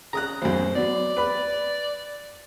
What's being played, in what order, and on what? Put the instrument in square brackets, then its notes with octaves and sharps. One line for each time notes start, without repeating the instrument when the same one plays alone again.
[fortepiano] C#3 D#6 F#6 [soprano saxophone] A#5
[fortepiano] B1 F#2 [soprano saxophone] C5
[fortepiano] F#3 B3 [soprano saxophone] D5
[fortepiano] B4 B5